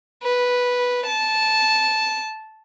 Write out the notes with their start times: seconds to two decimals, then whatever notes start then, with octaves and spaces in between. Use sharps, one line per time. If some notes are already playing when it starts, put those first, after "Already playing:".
0.23 B4
1.06 A5